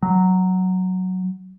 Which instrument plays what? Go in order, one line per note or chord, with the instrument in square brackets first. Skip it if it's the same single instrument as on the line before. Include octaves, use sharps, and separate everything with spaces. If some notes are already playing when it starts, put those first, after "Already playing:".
[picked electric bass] F#3